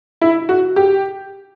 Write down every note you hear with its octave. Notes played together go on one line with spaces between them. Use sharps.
E4
F#4
G4